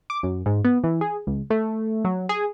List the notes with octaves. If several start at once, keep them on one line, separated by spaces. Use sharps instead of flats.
D6
F#2
G#2
B3
E3
G#4
C#2
A3
F#3
G#4